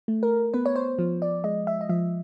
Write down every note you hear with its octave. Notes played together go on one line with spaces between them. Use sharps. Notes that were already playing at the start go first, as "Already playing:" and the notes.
A3
A#4
B3 B4
C#5
C5
F3
D5
G#3 D#5
E5
D#5
F3 E5